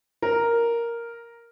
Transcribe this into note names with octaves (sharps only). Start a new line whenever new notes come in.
A#4